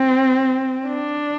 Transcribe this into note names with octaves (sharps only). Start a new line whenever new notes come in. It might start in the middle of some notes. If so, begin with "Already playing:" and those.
Already playing: C4
D4